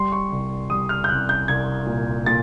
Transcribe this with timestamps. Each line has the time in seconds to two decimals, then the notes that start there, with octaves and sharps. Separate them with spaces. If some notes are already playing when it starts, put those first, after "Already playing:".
Already playing: G3 C6
0.12 C#6
0.32 C2
0.70 G3 D#6
0.89 F6
1.04 G6
1.09 C2 F#6
1.29 G6
1.48 C2 G#6
1.86 A#2
2.26 A#2 A6